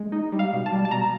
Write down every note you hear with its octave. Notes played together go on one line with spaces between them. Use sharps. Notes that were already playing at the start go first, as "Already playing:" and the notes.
Already playing: G#3
D#4
G3
F5
B2
A5
G3
A5
B2 A#5